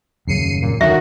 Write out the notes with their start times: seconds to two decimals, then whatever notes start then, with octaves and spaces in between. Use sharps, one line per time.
0.28 D#1 F#2 C#3 C7 C#7 D#7
0.61 A#2
0.81 D#1 D3 D#3 F#3 F#4 E5